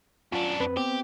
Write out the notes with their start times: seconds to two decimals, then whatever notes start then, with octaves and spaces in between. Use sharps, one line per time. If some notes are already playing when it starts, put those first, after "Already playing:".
0.32 F#2 D4 F4
0.60 F2 C4 B4
0.77 B3 C4 G4